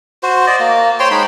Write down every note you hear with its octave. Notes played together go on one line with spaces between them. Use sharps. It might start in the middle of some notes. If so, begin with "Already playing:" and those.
F#4 C5
D5 D#5
A#3
C5 C#5 G5 C6
G#3 D#4 B5